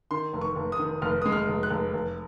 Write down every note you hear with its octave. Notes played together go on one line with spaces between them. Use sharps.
D#3 C6
F1
C#6
F1
D#6
D#3
F1 F6
G#3 D#6
F6
F1
F#6
F1
F1